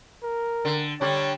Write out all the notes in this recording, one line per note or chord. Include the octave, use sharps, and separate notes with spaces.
A#4
D3
D3 G3 D4 C#5